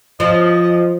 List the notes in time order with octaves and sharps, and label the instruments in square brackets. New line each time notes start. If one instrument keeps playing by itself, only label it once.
[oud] F3 [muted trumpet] D#5